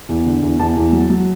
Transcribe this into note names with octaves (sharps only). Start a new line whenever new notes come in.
E2
D3
E2
E2 A5
E2
F#3
F#3